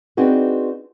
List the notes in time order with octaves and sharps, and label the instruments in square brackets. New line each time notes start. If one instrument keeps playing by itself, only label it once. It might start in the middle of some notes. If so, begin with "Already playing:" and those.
[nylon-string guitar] C4 D4 D#4 F#4 G#4 B4